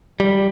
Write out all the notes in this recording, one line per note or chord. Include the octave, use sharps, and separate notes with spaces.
G3